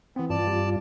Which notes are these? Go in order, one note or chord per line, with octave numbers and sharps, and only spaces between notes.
E3 B3 C4
G2 F4 D5 A5
G3